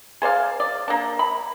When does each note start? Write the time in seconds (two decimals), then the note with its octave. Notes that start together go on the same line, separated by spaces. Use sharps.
0.22 G#4 C5 D5 F5
0.60 D5
0.88 A#3 D4
1.19 B5